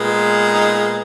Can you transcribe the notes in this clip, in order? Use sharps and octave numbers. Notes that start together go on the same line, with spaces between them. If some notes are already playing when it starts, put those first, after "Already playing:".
Already playing: A#2 G#3 B3
D#4